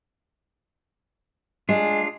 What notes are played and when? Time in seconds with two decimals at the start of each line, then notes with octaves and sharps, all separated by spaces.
1.69 G#3 D4 F4